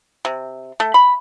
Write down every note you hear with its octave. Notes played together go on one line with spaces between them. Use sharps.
C3
A3
B5